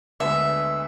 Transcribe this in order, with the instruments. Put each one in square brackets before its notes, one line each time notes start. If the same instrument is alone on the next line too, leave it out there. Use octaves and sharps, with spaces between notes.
[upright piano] D2 D3 G#3 B3 [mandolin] E5